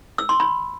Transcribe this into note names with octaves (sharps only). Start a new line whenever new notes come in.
E6
C6
B5